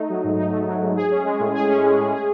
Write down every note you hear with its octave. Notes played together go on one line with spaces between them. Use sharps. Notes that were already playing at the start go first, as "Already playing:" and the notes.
Already playing: A3 D#4
F#3
G#2
D#4
A3
F#3
G#2
G#4
C#4
G#3
A2
G#4
C#4
G#3
A2
G#4